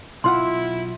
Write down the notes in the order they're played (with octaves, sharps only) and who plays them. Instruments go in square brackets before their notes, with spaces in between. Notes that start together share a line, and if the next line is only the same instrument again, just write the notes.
[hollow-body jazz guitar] B1 F4 F#5 [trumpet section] E4 [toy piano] C6